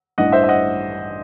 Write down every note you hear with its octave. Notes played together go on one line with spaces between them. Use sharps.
A1 G2 E3 D#5 F#5
C5 E5
E5
D#5 F#5